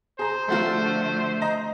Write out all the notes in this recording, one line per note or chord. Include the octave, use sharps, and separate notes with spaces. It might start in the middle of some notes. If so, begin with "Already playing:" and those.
G#4 C5 A#5
D3 F3 A3 F4 F#4 A4
D#5 A#5